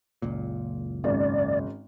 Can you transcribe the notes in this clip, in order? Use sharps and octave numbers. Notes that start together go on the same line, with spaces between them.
F#1 C#2 A#2
G#1 C#4 D5